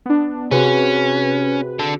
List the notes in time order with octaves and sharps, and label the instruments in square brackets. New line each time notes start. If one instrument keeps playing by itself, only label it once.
[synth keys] B3 D4
[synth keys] C3 B4 [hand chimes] C4 F#4 G#4 [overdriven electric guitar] C#4
[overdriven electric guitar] D3 A4